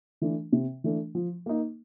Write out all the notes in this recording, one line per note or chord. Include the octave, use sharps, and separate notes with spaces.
E3 A3 D4
C3
E3 A3 D4
F3
A#3 D#4